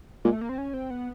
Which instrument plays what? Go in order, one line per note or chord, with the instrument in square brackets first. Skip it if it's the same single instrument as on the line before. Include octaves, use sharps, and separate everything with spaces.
[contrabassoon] A#2 [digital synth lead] G#3
[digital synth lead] A3
A#3
C4
C#4
C4
B3